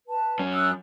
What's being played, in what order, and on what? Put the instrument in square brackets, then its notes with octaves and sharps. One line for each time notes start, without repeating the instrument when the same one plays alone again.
[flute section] B4 A5
[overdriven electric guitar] F#2 C#4
[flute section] D#6 E6 F#6